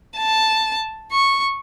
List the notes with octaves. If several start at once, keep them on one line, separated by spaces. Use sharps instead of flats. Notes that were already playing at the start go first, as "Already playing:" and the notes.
A5
C#6